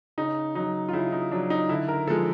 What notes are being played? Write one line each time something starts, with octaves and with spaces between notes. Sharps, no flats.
C#3 D#4
F#3 D#4
F4
C#3 E4
D#4
F#3 D4
D#4
D3 E4
A#4
F3 G#3 A4